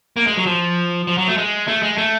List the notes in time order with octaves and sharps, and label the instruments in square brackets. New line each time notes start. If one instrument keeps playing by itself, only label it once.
[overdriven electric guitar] A#3
G#3
F#3
F3
F3
F#3
A3
G#3
A3
G#3
A3